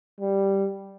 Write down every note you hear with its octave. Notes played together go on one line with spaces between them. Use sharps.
G3